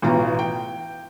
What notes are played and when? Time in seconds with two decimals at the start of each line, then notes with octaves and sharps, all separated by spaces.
0.02 A1 B2 F4 A#5
0.39 G5